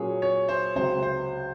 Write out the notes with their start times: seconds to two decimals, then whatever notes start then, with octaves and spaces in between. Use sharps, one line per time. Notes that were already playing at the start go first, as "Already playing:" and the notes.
Already playing: A#2 F#3 C#4 G#4 C#5
0.22 C#5
0.48 C5
0.75 C#2 C3 F#3 C4 C5
1.03 C5